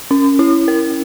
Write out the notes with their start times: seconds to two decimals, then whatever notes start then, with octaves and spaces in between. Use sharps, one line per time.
0.11 C#4
0.39 E4
0.68 A#4